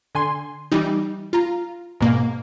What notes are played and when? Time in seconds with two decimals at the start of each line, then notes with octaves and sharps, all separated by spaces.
0.15 D3 G#5 C6
0.72 E3 G3 D#4
1.33 F4 A#5
2.00 G#2 B2 A#3